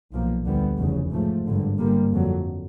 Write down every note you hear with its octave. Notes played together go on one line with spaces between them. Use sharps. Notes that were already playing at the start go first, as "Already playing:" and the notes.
B1 A#2 F3 A#3
D2 D3 G3 B3
F1 E2 C#3
G#2 F3 A3
G#1 G2 D3
G1 G2 D3 G3 A#3
F2 D3 F#3